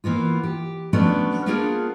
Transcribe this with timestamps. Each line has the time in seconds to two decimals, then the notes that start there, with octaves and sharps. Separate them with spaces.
0.04 E3 A#3 B3 F4
0.43 G4
0.93 F3 F#3 A3 B3 C#4 D4
1.46 A#3 B3 D4 F4 G#4 A#4